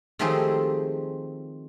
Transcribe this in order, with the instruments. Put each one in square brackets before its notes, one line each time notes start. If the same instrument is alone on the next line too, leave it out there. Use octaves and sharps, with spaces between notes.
[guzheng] D#3 F3 A3 C4 G4 G#4